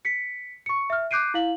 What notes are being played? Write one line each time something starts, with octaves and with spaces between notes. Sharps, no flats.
B6 C#7
C#6 C#7
E5 F6
D6 F#6 G6 C7 D7 D#7
E4 F5 F#7